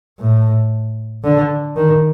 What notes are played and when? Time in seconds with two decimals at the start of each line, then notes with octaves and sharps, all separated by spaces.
0.20 A2
1.24 D3
1.75 D#3